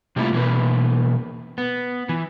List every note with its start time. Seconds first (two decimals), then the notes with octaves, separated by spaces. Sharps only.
0.16 C3 G3 A3 A#3 E4 F4
0.33 B2 E3 A#3 B4
1.58 B3
2.09 E3